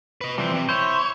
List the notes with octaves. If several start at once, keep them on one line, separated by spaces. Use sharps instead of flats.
B4 D#5
C3 E3 F3 G3 C5
C3
E4 C5 C#5